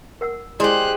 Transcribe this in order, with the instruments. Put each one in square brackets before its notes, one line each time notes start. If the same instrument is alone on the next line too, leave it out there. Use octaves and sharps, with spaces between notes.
[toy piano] A#4 F#5 E6
[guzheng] G#3 G4 [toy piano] E4 D5 C6 [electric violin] C5 F#6